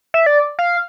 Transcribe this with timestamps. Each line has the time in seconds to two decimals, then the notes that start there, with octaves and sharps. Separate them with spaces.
0.14 E5
0.26 D5
0.59 F5